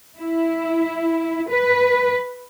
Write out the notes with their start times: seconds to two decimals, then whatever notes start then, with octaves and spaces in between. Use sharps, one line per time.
0.18 E4
1.51 B4